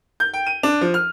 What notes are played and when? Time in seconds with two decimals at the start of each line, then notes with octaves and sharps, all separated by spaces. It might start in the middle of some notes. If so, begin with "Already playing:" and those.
0.20 G6
0.34 G5
0.47 D#7
0.63 D4
0.81 F3
0.94 F6